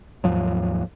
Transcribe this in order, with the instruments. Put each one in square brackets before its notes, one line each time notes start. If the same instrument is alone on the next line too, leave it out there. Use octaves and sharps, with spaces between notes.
[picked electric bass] D#2 G#2 F3 F#3